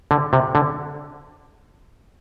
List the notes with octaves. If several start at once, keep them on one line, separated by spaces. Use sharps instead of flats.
D3
C3
D3